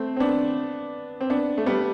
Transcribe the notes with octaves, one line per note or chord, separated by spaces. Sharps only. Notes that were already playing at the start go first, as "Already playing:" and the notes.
Already playing: A3 C4
C4
B3 D4
C4
B3 D4
A3
G3 B3